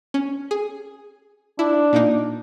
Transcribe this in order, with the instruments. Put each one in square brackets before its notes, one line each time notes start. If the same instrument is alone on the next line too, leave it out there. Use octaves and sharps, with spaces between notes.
[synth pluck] C#4
G#4
[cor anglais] D4 [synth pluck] E4
[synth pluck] A#2 A#3 D#4